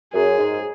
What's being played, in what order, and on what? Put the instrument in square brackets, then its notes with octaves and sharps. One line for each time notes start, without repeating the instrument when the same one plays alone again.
[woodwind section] F#2 [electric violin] G#4
[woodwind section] G#2